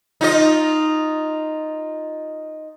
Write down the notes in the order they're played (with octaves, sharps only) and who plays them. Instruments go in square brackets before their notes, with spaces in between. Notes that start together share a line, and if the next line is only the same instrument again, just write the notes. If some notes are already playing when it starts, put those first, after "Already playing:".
[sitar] D#4 F4 D#5